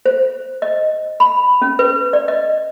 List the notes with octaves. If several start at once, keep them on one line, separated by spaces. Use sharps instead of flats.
C5
D#5
B5
C#4
B4
D5
D#5